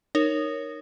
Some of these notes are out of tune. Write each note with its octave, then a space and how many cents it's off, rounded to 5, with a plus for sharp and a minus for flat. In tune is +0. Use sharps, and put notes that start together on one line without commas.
D#4 -15 A#4 +0 C#5 +0